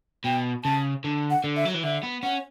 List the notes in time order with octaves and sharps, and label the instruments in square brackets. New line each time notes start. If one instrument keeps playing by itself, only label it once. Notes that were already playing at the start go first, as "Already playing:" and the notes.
[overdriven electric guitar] B2 [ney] G5
[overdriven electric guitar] C#3 [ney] A5
[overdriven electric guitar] D3
[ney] F#5
[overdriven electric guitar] D3
[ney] E5
[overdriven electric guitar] F#3
E3
[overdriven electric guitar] D3 [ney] E5
[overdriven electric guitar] B3
[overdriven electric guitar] C#4 [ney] F#5